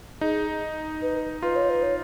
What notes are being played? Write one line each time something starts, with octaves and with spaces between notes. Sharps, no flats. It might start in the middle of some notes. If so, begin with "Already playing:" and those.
D#4 G#4
B4
F4 B4
C#5
B4
C#5